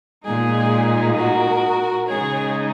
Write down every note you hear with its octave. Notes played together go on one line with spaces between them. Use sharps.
A#2 G#3 D#4 G#4
F#4 A#4
C#3 G#3 D#4 G#4 C#5